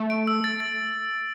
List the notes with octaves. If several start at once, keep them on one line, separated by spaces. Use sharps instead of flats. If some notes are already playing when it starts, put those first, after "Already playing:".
Already playing: A3
D7
E6
A6
A6